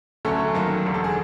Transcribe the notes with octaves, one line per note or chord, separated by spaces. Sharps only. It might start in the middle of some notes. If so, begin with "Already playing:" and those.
D2 D3 F#3 A3 C#4 A4
F#2 D#3 F#3 A#3
E1 D#2 D3
A4
G#4